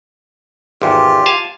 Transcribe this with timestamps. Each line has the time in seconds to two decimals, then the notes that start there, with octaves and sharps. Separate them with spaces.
0.82 G#1 E2 F4 G4
1.26 F5 G#5 A5